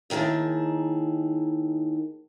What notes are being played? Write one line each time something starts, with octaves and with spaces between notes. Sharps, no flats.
D#2 D#3 E4 G#4 A5